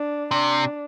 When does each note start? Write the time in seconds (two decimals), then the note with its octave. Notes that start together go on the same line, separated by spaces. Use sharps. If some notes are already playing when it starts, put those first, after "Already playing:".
Already playing: D4
0.31 C3 D4